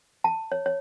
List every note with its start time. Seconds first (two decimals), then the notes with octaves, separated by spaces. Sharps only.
0.24 A5
0.52 C#5
0.66 C#5